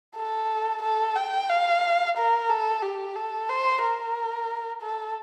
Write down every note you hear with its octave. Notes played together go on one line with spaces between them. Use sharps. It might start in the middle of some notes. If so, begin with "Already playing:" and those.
A4
A4
G5
F5
A#4
A4
G4
A4
C5
A#4
A4